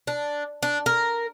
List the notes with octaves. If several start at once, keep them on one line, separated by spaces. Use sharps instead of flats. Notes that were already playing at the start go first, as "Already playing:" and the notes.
D4
D4
A#4